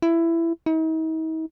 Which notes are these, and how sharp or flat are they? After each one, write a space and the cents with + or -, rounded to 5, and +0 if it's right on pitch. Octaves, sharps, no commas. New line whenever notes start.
E4 +15
D#4 +45